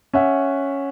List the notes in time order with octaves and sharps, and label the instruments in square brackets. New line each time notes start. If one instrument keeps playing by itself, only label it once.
[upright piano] C#4 E5 F#5